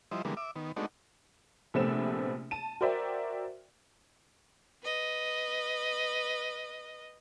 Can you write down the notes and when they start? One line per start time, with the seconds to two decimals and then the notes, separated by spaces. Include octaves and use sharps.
0.11 F3 G3 E4 C5 D#5
0.25 D3 E3 G3 G#3 A#3 B3
0.37 E5 D6
0.56 D#3 B3
0.76 G#3 A3 B3 D4 D#4 F#4
1.74 A#1 C3 A3 B3 C4 E7
2.51 A5 D#7
2.81 F#4 A#4 C5 D5 E5 G5
4.83 B4 D#5